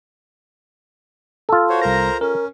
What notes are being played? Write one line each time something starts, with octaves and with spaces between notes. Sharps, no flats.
F4 A4
F#4 C5 C#5
C2 A#4 C5 A#5 A#6
C#4 A#4